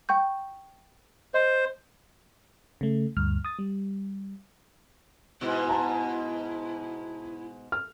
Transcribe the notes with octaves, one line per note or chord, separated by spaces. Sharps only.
G5 C#6 G6
C5 D#5
C#3 A3
D2 G2 F6
D#6 A6
G3
G#2 B2 E4
A5 A#5
F6